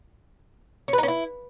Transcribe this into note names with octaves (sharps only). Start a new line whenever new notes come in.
C#4
B4
D#4
C#4
E4